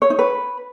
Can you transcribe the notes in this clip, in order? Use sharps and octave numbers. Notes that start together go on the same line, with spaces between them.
C#5
D#4
B4